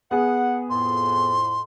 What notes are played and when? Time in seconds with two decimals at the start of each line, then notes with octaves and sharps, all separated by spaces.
0.11 B3 G#4 F#5
0.70 F2 A2 C6